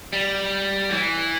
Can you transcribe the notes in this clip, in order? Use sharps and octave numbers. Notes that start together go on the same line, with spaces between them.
G3
E3